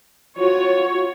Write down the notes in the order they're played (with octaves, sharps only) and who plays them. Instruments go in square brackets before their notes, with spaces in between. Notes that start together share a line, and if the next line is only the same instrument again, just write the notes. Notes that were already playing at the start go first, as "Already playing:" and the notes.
[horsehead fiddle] F4 F#4 [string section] C#5